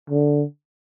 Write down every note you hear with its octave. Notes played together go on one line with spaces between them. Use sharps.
D3